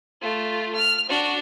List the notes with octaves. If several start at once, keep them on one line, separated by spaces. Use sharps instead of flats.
A3 F4
F6
D4 F#4